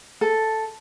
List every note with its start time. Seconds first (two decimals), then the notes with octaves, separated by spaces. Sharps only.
0.21 A4